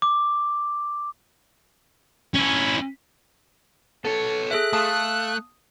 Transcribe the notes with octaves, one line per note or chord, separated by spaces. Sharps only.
D6
C#4 E4
B3 A4 C#5
G#4 A4 E5 F#6
A3 F5 A5 D#6